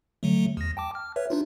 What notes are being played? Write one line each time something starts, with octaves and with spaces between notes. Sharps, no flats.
D3 F#3 A3
E2 A#6
G5 A5 D6
F6
B4 C#5 E5
D4 D#4 F4